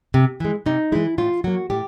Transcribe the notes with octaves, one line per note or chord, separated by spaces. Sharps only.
C3
E3 G#3
C3 D#4
E3 G#3 E4
A2 F4
F#3 A#3 F#4
A2 G4